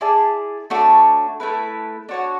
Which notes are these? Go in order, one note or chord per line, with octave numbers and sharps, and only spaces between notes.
E4 G#4 D5 A5
A3 D4 F#4 C#5
A3 E4 B4
D4 F#4 C#5 F#5